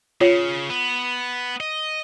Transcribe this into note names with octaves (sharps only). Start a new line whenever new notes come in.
C#3 F4 C#5
B3
D#5